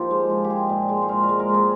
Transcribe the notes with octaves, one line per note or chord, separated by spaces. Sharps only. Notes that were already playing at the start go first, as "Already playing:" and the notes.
Already playing: F3 A#3 D#4 F4 G4
G#3
F3
G4
G#3 G#4
A#2
G#3
C5
A#2 A#4
A#4
G#3
A#4
G#3
G#4